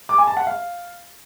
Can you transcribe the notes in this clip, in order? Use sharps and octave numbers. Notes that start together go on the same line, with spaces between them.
D6
G#5
A5
F#5
F5